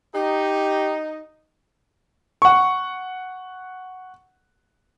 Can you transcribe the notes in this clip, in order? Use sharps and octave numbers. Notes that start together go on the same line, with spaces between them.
D#4 G4
F#5 C#6